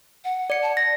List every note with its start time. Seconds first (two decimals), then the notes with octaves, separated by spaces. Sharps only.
0.24 F#5
0.50 D5 C#7
0.62 A5
0.77 D5 A#6